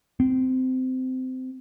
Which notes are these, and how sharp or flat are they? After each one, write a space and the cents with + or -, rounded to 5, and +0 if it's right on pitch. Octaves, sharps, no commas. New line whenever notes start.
C4 -20